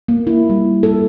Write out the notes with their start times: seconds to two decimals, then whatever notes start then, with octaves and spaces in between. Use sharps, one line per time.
0.08 A#3
0.27 E4
0.50 G3
0.83 A4